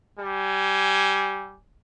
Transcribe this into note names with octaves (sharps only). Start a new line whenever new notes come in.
G3 G#5